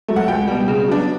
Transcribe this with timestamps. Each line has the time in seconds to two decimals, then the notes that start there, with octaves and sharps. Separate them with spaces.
0.08 F#3 A3
0.16 F#5
0.28 C#2 G5
0.47 B2 G3
0.68 C#3
0.88 F#3 B3 D4